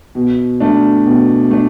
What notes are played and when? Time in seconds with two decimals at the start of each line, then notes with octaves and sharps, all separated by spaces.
0.15 B2
0.60 A3 D4
1.06 B2
1.51 A3 D4